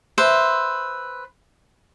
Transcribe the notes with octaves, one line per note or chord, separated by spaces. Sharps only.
B4 C5 E5